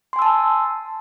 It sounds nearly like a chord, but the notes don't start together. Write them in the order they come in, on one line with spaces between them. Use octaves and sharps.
C6 G#5 E6 A5